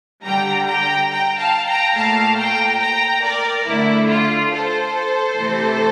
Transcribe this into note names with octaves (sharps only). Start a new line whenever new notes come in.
D3 G3 G5 A#5
G5 A#5
G5 A#5
F5 A5
G5 A#5
A#2 A3 F5 A5
G5 A#5
G5 A#5
A#4 D5
D3 A3 E4
F4
A4 C5
C3 E3 A3